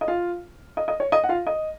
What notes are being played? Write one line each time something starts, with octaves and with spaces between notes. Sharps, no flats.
D#5
F4 F5
D#5
D#5
C#5
D#5
F#5
F4 F5
D#5